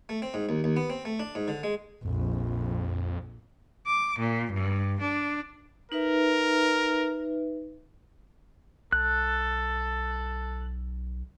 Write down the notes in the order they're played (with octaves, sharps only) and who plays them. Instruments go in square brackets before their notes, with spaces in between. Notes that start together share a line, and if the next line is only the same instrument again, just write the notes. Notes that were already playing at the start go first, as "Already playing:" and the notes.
[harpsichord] A3
C4
G#2
D#2
D#2
B3
C4
A3
D4
G#2
D3
G#3
[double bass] A#1 [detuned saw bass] F2
[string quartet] D6
A#2
G2
D4
[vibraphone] D#4 B4 E5 [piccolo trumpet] A#4
[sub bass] B1 [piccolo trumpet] A4 [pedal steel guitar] F#6